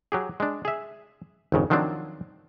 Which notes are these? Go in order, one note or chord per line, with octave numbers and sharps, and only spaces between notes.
F#3 G4 G#4
G#3 D4
G#4 E5
G#1 F2 C#3
D#3 F3 F#3 C4 D4